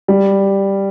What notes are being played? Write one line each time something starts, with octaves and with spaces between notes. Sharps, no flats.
G3